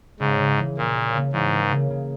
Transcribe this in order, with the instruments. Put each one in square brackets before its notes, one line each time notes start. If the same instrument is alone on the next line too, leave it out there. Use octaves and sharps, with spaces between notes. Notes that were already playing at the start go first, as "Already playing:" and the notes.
[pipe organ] G#2 [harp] C#3
[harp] C#3
E3
[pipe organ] A#2 [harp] A#3
[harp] C#3
C#3
[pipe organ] G#2 [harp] E3
[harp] A#3
C#3
C#3